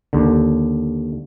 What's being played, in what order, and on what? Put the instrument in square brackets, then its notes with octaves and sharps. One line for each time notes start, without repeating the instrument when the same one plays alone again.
[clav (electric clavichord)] D#2 D3